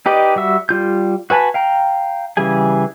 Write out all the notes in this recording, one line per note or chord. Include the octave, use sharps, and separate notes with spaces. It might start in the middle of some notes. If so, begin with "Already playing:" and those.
D#4 G4 B4 D5 D#5
G3 F#4 E5
G3 F4 G6
F#4 B4 G#5 A5 B5
F5 G5 A#5
C#3 E3 G3 G#4 G#5